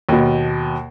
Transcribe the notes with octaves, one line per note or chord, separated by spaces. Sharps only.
D#2 B2